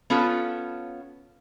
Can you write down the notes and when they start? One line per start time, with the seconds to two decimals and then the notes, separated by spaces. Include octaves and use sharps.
0.10 B3 C#4 F4 A4